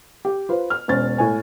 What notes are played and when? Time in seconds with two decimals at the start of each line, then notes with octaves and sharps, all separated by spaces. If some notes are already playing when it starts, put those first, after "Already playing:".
0.25 G4
0.49 F4 B4 C5
0.70 F6
0.88 E1 C#4 C5 A6
1.18 A2 G#5